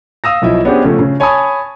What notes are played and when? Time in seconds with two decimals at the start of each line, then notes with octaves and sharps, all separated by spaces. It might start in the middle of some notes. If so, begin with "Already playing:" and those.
0.24 F5 D#6 E6 A#6
0.42 B1 B2 F3 E4 D#5 E5
0.65 B3 C#4 D4 G4 G#4 C5
0.84 C#3 F3 A3
0.99 C#3
1.20 C#5 G#5 A5 B5 C#6 D#6